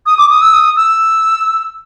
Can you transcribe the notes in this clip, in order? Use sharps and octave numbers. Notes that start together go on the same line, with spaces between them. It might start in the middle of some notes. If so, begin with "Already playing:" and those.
D#6
D6
D#6
E6
D#6
E6